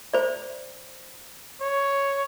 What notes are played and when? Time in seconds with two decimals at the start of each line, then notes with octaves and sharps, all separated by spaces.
0.13 C5 D5
1.61 C#5